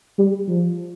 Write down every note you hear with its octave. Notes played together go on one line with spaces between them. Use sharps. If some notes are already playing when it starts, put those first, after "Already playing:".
G3
F3